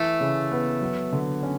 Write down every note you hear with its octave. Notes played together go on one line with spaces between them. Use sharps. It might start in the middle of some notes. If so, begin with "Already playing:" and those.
Already playing: E3 A3
C#3
B3
F#3
D3
C#4